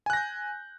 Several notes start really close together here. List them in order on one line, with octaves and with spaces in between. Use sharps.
G#5 F#6 A#6 G6